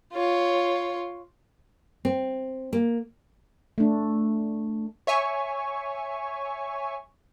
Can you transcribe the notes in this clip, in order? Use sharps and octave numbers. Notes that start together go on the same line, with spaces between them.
F4 C#5
C4
A#3
A3 D4
C#5 E5 G#5 C#6